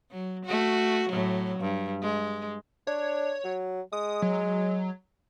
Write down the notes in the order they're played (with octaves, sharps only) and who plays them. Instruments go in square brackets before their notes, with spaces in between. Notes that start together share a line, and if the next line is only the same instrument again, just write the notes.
[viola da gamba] F#3
A3 F#4
A2 F#3
G2
G#3
[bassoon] D4 [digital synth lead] C#5
[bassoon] F#3
[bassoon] G#3 [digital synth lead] D#6
[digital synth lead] F#3